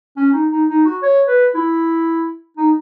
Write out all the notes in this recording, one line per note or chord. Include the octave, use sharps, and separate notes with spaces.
C#4
D#4
D#4
D#4
F#4
C#5
B4
E4
D#4